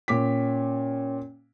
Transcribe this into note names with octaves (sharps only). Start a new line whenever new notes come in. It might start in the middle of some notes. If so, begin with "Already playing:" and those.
A#2 C#4 C#5 G5 D6 B6